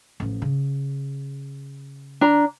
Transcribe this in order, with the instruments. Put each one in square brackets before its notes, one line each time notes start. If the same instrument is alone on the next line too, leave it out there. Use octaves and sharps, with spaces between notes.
[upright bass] A1 F3
C#3
[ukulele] D4 A#5